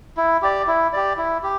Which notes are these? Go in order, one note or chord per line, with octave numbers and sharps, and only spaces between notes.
E4
G4 D5
E4
G4 D5
E4
G4